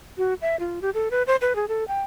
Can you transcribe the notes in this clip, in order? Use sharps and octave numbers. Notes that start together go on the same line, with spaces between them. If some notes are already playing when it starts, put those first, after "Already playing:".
F#4
E5
F4
G4
A4
B4
C5
B4
G#4
A4
G5